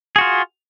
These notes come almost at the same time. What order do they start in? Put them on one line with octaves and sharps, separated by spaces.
G#4 F#4 F4